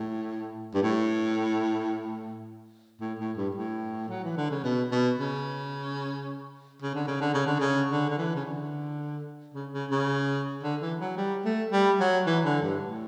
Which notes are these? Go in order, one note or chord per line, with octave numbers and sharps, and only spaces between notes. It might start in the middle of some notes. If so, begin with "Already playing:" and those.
Already playing: A2
G2
A2
A2
A2
G2
A2
F#3
E3
D3
C#3
B2
B2
C#3
C#3
D3
C#3
D3
C#3
D3
C#3
D3
D3
E3
C#3
D3
C#3
C#3
C#3
D3
E3
F#3
G3
A3
G3
F#3
E3
D3
G2
A2